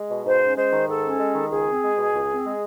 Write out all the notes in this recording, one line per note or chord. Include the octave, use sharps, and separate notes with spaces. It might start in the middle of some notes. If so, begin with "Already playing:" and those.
Already playing: G#3
B2
G#2 C5
C#4
G#3 C5
D#3
G#2 A4
C#4
G#3
D#3
C#2 G#4
C4
G#3
B2
C#2
C4
G#3